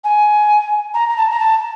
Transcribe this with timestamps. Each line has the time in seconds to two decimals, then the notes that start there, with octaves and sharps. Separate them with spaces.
0.04 G#5
0.94 A#5
1.09 A#5
1.17 A5
1.30 A#5
1.40 A5